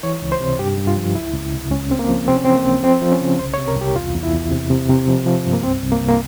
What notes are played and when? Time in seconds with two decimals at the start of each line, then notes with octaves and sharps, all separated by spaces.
0.03 E3 C#5
0.22 C#2
0.32 C5
0.40 C3
0.59 G2 G4
0.78 G2
0.87 F4
0.97 F3
1.15 C#2 E4
1.34 C#2
1.53 C3
1.71 C#2 C#4
1.90 C#3 C4
1.99 A#3
2.09 F3
2.27 C3 C4
2.36 C#4
2.45 E3 C4
2.55 A#3
2.65 C#2
2.84 F3 C4
3.02 F3
3.12 C#4
3.21 C#3
3.39 C2 C5
3.54 C#5
3.58 C3
3.68 A#4
3.77 C2 G4
3.95 E2 F4
4.14 E2
4.23 E4
4.33 E2
4.51 C3
4.70 C3
4.89 C3
5.07 F3
5.26 F3
5.45 G2
5.53 A#3
5.63 C2 C4
5.82 C2
5.92 A#3
6.02 C2
6.08 A#3